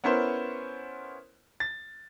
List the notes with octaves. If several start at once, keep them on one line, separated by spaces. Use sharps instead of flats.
B3 C#4 E4 A#4 C5
A6